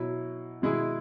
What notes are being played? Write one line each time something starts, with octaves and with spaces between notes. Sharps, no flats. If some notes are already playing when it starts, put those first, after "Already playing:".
Already playing: B2 F#3 E4
B2 G#3 E4 G#4